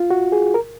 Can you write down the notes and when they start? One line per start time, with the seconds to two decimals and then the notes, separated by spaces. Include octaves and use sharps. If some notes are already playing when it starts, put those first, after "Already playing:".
Already playing: F4
0.10 F#4
0.32 G#4
0.54 A#4